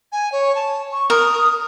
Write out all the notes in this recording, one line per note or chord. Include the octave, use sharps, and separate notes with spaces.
G#5
C#5
A5
C#6
A#4 D#6